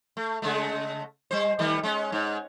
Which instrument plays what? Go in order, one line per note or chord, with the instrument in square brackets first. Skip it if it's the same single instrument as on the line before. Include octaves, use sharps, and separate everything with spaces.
[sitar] A3
C#3 G#3 A3
G3 C5
D#3 G3 A3
G#3 C#4
G#2